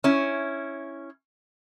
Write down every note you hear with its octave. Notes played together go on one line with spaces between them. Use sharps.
C#4 E4